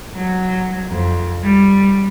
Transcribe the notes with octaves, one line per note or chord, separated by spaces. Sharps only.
F#3
F2
G3